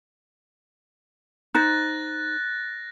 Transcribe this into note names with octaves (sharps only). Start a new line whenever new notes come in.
D#4 C5 F#6 A6 A#6